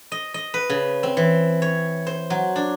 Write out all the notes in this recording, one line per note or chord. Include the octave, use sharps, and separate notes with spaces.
D#5
D#5
B4
C#3
C4
E3
C#5
C5
F#3
D4